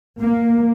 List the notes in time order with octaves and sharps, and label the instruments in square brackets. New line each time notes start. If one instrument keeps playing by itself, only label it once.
[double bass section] A#3